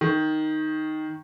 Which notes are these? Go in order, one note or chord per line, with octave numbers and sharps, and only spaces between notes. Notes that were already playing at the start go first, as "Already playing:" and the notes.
D#3